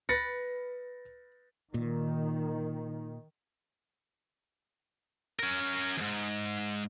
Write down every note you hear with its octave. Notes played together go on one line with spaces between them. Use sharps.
B4 A6 A#6 C#7
A#2 D#3
C#4 A#4
D#2 G#2